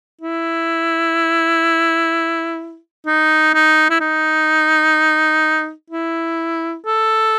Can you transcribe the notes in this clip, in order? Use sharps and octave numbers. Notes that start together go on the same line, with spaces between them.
E4
D#4
D#4
E4
D#4
E4
A4